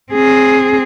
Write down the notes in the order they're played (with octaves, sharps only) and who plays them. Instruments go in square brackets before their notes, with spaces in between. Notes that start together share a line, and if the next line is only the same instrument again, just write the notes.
[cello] C4 G#4